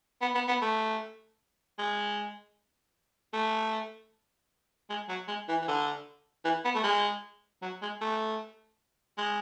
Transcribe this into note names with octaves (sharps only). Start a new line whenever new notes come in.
B3
B3
B3
A3
G#3
A3
G#3
F#3
G#3
E3
E3
D3
E3
B3
A3
G#3
F#3
G#3
A3
G#3